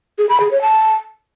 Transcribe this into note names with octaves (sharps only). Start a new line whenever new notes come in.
G#4
B5
G#4
C#5
A5